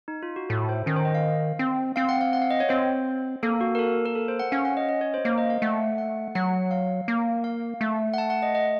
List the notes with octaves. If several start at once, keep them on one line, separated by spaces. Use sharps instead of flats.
D#4
F4
F#4
A2 A4
C5
D#3 C#4
C5
D#5
F5
C4
C4 F5
F#5
F5
F#5
F5
D#5
C#5
C4 C5
A#3 A4
F#4
A#4
A4
A#4
A4
C5
F#5
C#4 F5
F#5
D#5
D#5
C#5
C5
A#3 C5
D#5
F5
A3 F#5
F#5
F#3 F#5
F5
A#3
F5
A3
F#5
A5
F#5
D#5
D#5